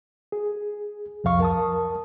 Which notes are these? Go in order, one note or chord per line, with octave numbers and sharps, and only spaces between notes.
G#4
C2 F2 F3 F5 C#6
A#4 A5 D#6